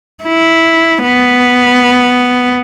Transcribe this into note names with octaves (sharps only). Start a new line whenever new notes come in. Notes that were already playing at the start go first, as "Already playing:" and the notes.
E4
B3